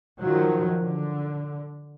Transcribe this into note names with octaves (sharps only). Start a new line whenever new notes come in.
D#3 F3 F#3
D3